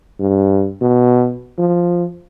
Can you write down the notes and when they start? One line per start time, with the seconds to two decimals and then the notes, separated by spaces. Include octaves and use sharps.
0.20 G2
0.81 B2
1.58 F3